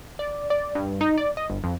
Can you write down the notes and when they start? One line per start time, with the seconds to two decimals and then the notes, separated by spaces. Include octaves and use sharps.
0.19 D5
0.50 D5
0.75 G2
1.01 D#4
1.17 D5
1.37 D#5
1.50 G1
1.64 F2